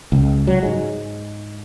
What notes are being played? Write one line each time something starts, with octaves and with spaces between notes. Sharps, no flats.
C#2
F#3
G#2 G#3